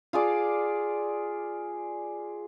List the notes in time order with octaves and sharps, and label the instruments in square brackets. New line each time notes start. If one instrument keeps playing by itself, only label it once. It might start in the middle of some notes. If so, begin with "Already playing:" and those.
[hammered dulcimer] F4 G#4 D5